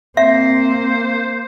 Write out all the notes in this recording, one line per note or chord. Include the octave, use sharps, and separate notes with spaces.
A#3 C4 C5 E5